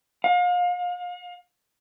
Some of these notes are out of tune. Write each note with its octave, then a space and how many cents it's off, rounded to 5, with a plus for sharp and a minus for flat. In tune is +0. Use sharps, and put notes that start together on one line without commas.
F5 +35